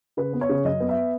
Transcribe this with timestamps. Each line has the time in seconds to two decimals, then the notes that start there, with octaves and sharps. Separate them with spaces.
0.17 C#3 B4
0.33 B3
0.41 C#5
0.49 C#3
0.64 F#2 D#5
0.80 B3
0.89 E5